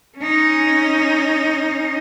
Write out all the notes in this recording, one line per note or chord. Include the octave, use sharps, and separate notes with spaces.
C#4 D#4